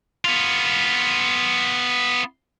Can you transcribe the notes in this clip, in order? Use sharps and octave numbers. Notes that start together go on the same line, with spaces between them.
B3 F4